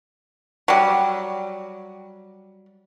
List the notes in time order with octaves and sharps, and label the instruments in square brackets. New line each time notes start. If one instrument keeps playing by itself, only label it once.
[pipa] F#3 G3